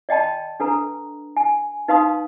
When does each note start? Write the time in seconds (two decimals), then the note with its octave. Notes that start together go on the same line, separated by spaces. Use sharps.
0.09 D5 D#5 G5 A5 B5
0.60 D4 A4 B4 A#5
1.37 G#5
1.88 D#4 B4 F5 A5 C6 D#6